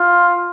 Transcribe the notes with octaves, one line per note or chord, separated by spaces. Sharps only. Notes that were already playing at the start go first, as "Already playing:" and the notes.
Already playing: F4